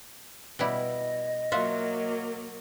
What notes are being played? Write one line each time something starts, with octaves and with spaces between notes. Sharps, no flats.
B2 G3 E4 D#5
F#3 A#3 F4 E5 F#5